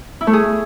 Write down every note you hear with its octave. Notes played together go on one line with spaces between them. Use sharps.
E4
A3
G#4